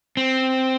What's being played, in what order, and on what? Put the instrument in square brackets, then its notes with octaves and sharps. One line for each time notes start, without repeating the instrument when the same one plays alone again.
[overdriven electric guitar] C4